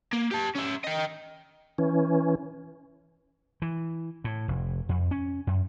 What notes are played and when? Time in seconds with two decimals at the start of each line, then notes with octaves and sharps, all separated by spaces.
0.13 A#3
0.32 G4 A5
0.56 C#4 E5
0.84 D#5 G5
1.78 E3 C#4
3.62 E3
4.24 A2
4.48 F1
4.89 F2
5.11 C#4
5.47 F#2